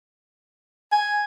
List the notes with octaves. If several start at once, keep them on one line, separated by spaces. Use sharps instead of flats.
G#5